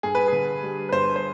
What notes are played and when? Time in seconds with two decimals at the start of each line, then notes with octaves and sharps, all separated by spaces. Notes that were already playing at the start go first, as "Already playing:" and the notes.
0.03 G2 G#4
0.15 B4
0.28 D3 G#4
0.63 G3
0.89 B4
0.92 G2 C5
1.16 C5